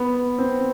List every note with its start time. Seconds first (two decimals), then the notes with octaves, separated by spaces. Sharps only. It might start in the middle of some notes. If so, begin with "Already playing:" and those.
Already playing: B3
0.38 C4